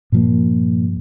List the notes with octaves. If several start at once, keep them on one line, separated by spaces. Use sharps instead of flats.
G2 A#2 F3 A#3